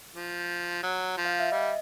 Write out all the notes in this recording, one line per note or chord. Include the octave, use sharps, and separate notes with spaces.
F3
F#3
F3
F5
E5
G3 D#5